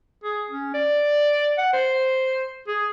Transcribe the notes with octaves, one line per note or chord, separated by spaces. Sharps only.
G#4
C#4
D5
F#5
C5
G#4